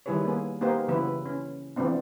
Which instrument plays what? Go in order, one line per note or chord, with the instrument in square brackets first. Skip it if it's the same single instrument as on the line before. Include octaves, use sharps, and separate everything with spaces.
[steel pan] D#3 G3 E4 G#4 B4 C#5
A#3 B3 G#4
A#3 B3 D#4 G4 C5
C#3 E3 F#3 B3 E4 B4
C#4
E3 F3 G#3 B3 C4 D4